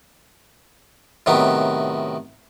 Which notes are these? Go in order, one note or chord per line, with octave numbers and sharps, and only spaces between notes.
A2 C3 D#3 F#3 B3